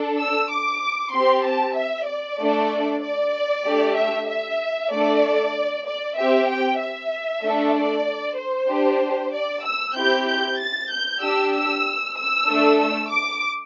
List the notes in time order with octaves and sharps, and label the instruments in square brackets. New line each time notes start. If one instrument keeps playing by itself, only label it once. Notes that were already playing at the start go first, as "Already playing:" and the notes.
Already playing: [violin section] D4 A4
E6
D6
C4 G4 C6
A5
E5
D5
A3 D4 A4
D5
A3 D4 G4
E5
E5
A3 D4 A4 D5
D5
C4 G4 E5
G5
E5
A3 D4 A4
D5
C5
D4 G4
D5
E6
C4 E4 G4 G6
G6
A6
G6
D4 G4 E6
E6
E6
A3 D4 A4
E6
D6